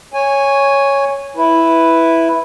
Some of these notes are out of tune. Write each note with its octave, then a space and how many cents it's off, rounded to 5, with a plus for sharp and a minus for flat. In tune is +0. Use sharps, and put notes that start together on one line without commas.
C#5 +0 G#5 -10
E4 +0 B4 +0